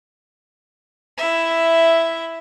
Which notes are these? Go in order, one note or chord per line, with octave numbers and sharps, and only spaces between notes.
E4 E5